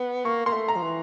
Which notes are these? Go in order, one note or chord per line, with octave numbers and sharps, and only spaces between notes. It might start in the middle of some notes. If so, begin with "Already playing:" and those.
Already playing: B3
A#3 C#6
A#3 C6
A3
A#5
F3
E3